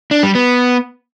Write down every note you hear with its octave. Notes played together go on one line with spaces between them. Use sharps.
D4
G3
B3